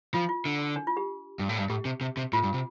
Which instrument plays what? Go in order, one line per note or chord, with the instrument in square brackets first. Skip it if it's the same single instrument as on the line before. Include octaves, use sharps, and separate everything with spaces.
[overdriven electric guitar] F3 [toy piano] F4
[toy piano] F4
[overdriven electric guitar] D3
[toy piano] D4
F4
G4
[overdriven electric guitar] G2
A2
G2
[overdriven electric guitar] A2 [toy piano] G4
[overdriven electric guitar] C3
C3
C3
[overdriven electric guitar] A2 [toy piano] F4
[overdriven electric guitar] G2
C3